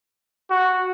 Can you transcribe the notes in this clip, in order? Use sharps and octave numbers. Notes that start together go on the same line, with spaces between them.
F#4